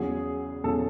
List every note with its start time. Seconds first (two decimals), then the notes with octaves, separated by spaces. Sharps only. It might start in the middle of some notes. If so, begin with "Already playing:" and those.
Already playing: E2 C#3 F#3 G#4
0.64 E2 C#3 F#3 A4